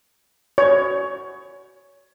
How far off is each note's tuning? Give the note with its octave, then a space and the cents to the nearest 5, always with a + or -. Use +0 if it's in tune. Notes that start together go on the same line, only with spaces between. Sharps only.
C#5 +15